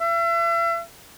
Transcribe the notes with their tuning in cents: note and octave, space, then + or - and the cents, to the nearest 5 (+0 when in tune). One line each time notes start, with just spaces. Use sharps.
E5 +40